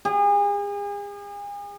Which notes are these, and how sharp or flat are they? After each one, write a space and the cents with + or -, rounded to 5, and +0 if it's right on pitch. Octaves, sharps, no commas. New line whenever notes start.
G#4 -40